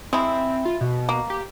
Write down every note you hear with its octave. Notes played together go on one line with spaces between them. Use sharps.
G#3 C4 E4
F4
B2
A#3
G4